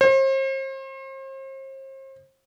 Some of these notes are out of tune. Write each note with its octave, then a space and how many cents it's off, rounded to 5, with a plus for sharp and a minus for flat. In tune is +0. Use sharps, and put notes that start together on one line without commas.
C5 +40